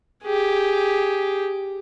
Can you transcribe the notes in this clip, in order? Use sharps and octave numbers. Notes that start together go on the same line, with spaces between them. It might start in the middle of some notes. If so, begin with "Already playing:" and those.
G4 G#4